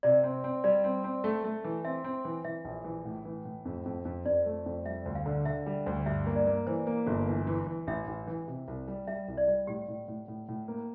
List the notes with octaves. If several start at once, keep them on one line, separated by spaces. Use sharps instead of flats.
C3 D5
C4
C4
G3 D5
C4
C4
A3
A3
E3
C4 E5
C4
E3
E3 E5
A#1
E3
A2
E3
A2
F2
F2
F2
F2 D5
A3
F2
G3 E5
D2
F5
D3
D3 E5
G3
D2
G2 E5
A#3
D5
A#3
E3 C5
A#3
G1
E3
E3
E3
A1 E5
A1
E3
C3
C2
G3
G3 E5
C2
D5
G3
A2 G4
A2
A2
A2
A2
A#3